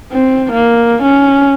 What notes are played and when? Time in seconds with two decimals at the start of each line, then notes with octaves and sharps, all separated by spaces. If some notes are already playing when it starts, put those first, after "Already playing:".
0.12 C4
0.52 A#3
1.03 C#4